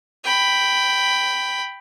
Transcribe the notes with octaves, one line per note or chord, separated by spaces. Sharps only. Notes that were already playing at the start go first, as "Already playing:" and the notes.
G5 B5